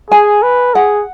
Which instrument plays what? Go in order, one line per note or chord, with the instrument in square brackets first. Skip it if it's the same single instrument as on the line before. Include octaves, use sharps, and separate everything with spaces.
[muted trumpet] G#4 [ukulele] G#5
[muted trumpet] B4
[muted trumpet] G#4 [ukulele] F#5